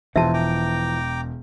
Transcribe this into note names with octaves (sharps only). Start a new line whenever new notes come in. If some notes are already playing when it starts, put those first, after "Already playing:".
E1 E3 F3 C4 F4 E5 A5
G5 A#5 D6